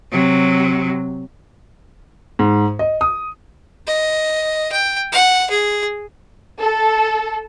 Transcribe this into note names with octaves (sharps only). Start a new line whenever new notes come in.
C3 F#3
G#2
D#5
D#6
D#5
G5
F#5
G#4
A4